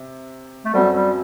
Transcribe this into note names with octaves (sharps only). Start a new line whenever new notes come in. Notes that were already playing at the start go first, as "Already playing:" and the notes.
Already playing: C3
A3
F#2 F#3 G3 C4 F#4 A4
G3